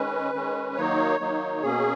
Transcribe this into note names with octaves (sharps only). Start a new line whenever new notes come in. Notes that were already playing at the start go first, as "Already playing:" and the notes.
Already playing: D#3 G#3 C#4 B4
D#3 G#3 C#4
D#3 F#3 A#3 D#4 C#5
D#3 F#3 A#3 D#4
B2 A#3 C#4 G#4